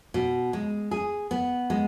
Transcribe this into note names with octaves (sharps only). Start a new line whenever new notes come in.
B2
G#3
G#4
B3
G#3